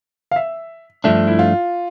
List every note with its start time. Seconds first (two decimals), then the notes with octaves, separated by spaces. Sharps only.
0.31 F5
0.36 E5
1.04 G2 F3 A3 D4 E5
1.27 E4
1.39 F4